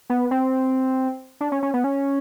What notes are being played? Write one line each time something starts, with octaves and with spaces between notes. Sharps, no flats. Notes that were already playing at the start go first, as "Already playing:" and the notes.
B3
C4
D4
C#4
C#4
B3
C#4